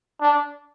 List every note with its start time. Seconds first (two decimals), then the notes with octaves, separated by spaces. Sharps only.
0.21 D4